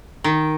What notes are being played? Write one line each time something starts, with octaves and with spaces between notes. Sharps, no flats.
D#3